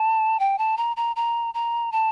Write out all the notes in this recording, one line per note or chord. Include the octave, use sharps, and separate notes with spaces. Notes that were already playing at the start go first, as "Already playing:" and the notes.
Already playing: A5
G5
A5
A#5
A#5
A#5
A#5
A5